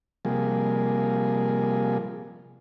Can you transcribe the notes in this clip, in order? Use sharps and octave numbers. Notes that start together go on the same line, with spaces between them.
C3 F3 G3 A#3 G#4